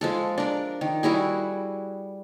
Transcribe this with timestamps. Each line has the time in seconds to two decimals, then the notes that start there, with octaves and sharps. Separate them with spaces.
0.01 F3 G#3 A4
0.38 D4 A#4
0.81 D#3
1.03 G3 E4 F#4 G#4